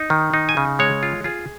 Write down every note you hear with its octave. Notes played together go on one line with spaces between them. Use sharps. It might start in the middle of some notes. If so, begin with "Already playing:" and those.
Already playing: D#4
D#3
D#4
G#5
C#3
G#3 C#5
F4
F4 G#4